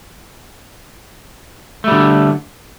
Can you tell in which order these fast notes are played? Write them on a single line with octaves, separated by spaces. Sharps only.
A3 G3 D3